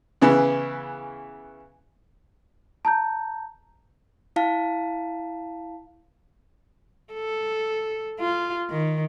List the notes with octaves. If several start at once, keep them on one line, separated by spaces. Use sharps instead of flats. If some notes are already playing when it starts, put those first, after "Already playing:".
C#3 E3 B3
A5 A#5 G6
E4 F5 A5
A4
F4
D#3